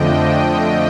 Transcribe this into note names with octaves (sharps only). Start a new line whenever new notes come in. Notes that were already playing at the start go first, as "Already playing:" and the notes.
Already playing: F2 D3 F3 A3 D4 D#5 G5